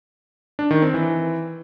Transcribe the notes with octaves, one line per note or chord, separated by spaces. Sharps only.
D4
D#3
C4
E3